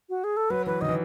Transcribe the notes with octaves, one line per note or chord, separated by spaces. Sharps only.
F#4
G#4
A4
F#3 B4
E3 B4
D#3 D#5
E3